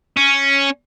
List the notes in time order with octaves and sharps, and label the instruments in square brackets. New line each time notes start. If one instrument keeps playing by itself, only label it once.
[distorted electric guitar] C#4